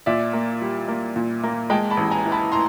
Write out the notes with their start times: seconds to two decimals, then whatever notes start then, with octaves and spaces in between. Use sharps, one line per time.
0.06 A#2 D5 E5
0.33 A#3
0.62 G3
0.88 A#3
1.16 A#2
1.44 A#3
1.70 G#3 G5 A5
1.90 A5 B5
1.97 A1
2.11 G#5 A#5
2.25 E3
2.32 A5 B5
2.52 A2 A#5 C6